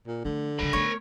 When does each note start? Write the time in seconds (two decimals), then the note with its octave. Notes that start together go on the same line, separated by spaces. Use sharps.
0.07 A#2
0.25 D3 F3 A3
0.59 C#3 F3 A#4 B5
0.73 A3 B3 C#5